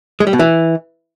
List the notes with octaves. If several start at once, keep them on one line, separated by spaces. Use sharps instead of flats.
G#3
G3
B2
E3